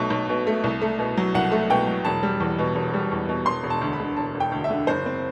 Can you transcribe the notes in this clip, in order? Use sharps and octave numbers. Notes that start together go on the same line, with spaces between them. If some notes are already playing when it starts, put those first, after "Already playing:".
Already playing: B1 B2 A3
B1
B2
A3
C2
A3
B2
F#3
C2 F#5
A3
B2 G5
F#3
E1 A5
G3
E2
B2
E1
G3
E2
B2
E1 C6
E1
A5
D2
B5
D3
E1 A5
E1
G5
D2
E5
D3
F#1 C5
C4